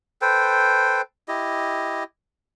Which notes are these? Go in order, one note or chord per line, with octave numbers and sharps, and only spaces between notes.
A4 B4 C5 G5
E4 G4 D#5